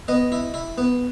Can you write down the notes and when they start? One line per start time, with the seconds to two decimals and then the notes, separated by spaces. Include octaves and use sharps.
0.08 B3 D#5
0.32 E4
0.54 E4
0.78 B3